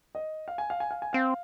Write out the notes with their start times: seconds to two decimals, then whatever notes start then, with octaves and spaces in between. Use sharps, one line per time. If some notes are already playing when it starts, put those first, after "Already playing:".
0.15 D#5
0.48 F5
0.58 G#5
0.70 F5
0.80 G#5
0.91 F5
1.02 G#5
1.13 C4 F5